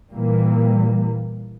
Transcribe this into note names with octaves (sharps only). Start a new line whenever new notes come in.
A#2 E3 G3 A#3